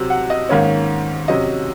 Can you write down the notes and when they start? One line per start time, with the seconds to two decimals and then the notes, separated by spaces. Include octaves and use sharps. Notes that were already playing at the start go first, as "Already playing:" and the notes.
Already playing: C3 F#3 C4
0.10 F#5
0.30 D#5
0.49 G#2 D#3 A#3 C#4 C#5
1.28 C3 F#3 C#4 D#5